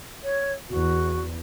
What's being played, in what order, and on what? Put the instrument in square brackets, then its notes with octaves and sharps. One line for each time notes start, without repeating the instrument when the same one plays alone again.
[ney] C#5
[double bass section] E2 [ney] F#4